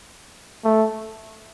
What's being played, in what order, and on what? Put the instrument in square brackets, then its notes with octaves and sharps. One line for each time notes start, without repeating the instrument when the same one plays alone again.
[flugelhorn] A3